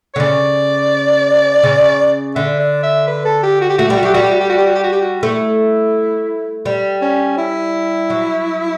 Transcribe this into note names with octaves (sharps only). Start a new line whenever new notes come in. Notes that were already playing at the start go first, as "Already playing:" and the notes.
D3 C#5
C#3 D5
C#3
D3 E5
D5
E5
B4
A4
G4
F#4
G4
A3 F#4
G3 G4
F#4
F#3 G4
G3 F#4
G4
F#4
G4
F#4
G4
F#4
G4
F#4
G4
F#4
A3 E4
G3
C#4
E4
F#3